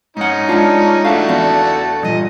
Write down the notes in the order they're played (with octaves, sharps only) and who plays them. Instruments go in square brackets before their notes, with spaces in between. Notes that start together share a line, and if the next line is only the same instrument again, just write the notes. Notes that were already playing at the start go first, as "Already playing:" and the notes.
[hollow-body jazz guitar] G#2 F#5 [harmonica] C#4 D#4
[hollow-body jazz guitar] G#3 F4 [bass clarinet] D4
[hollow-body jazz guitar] A2 E5 F5 [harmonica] A3 F#4 A4 [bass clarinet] D4
[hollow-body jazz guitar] E2 B3
[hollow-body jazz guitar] G2 [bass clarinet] A#2 [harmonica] D#5